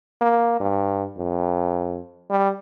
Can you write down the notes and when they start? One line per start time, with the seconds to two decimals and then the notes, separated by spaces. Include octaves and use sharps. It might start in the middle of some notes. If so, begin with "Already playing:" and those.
0.21 A#3
0.60 G2
1.17 F2
2.30 G3